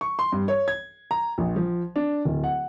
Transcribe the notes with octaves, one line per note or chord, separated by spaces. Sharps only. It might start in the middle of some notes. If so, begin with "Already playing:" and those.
C#6
C6
G2
C#5
G#6
A#5
A#1
F3
D4
D1
F#5